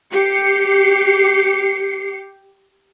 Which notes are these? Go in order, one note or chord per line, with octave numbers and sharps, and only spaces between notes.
G4 C7 C#7